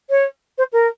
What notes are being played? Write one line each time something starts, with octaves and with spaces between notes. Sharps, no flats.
C#5
C5
A#4